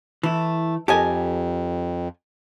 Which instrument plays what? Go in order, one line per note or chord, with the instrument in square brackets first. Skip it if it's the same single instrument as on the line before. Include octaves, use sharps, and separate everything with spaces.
[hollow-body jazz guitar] E3 E4 [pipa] A3
[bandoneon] F2 [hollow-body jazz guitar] G4 A#4 [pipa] A4 D#5 G#5